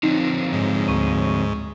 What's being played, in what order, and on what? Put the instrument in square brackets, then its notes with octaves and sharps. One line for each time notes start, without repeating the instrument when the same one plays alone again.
[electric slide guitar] D3 F3 C4 [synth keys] D#4
[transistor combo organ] G#2
[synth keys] D2 C#6 D#7